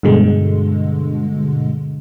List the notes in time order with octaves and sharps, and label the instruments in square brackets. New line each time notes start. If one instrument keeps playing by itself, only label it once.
[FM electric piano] G2 B2 D3 G#3